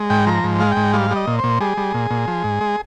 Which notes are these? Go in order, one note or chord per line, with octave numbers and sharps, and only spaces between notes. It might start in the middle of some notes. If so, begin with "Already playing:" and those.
Already playing: G#3
G#2 G5
F3 A#5
G#2
G#3 F5
G5
G#2
G3 F5
G3
D#5
A#2
C5
A#2
G3 G#4
G3
A#2
A#2
F3
G#2
G#3